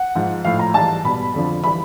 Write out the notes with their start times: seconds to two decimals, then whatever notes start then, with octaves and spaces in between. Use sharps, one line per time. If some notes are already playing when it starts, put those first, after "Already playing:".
Already playing: F#5
0.15 G#2 F3
0.45 A2 F3 F5
0.59 A#5
0.74 G#2 E3 G3 A5
1.04 B2 G3 B5
1.34 F2 D3 F3
1.64 E3 G3 B5